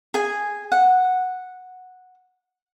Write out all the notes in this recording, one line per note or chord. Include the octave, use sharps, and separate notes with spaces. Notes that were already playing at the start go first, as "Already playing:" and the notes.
G#4 G#5
F#5